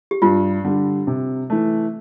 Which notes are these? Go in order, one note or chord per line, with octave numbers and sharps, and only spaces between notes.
G4
G2 F4
D3 G3
C3
E3 A3